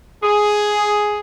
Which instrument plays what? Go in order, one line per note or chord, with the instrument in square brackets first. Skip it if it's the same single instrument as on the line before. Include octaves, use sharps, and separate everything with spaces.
[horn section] G#4